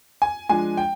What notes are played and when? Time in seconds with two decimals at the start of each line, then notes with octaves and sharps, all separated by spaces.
0.22 G#5
0.49 F3 G#3 D4 G#5
0.77 G5